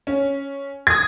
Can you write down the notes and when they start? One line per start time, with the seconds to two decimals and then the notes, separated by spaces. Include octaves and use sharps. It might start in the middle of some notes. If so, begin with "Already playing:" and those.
0.07 C#4
0.87 D#6 G#6